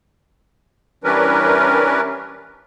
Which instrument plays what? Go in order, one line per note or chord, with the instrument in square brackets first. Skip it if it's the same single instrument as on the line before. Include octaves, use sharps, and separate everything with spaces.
[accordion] E3 G3 C#4 D4 A#4 B4